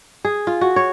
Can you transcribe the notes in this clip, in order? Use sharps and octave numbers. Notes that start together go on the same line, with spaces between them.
G#4
F4
F#4
C#5